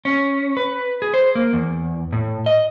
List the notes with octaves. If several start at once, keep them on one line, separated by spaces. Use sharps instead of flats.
C#4
B4
G#4
C5
A#3
E2
A2
D#5